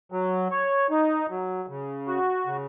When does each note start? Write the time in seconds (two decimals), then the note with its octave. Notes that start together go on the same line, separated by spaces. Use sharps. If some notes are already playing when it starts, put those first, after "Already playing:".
0.12 F#3
0.51 C#5
0.90 D#4
1.30 F#3
1.69 C#3
2.07 F#4
2.46 C#3